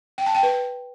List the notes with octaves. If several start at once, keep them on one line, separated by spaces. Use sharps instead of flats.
G5
A5
G5
B4